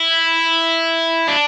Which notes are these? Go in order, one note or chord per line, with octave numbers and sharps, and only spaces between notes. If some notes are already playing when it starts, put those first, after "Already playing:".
Already playing: E4
D4